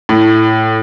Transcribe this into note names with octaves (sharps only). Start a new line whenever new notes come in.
A2